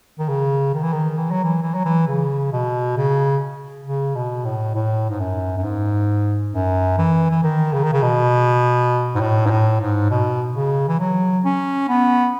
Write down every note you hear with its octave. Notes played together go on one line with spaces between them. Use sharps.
D#3
C#3
D#3
E3
D#3
E3
F#3
E3
E3
F#3
E3
C#3
B2
C#3
C#3
B2
A2
A2
G#2
F#2
F#2
G#2
F#2
E3
E3
D#3
C#3
D#3
C#3
B2
G#2
A2
G#2
A2
G#2
B2
C#3
E3
F#3
C#4
B3